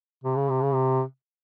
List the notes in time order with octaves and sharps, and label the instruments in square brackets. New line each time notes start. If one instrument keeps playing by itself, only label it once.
[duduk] C3
C#3
C3
C#3
C3